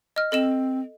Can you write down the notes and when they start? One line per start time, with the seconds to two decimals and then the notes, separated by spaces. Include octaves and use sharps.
0.16 D#5 F6
0.32 C4 A4 D#5 E7